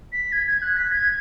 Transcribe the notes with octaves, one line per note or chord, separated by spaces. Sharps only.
B6
G#6
G#6
F#6
B6
G#6